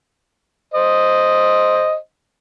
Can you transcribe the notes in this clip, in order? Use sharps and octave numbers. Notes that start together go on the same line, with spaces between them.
C5 D#5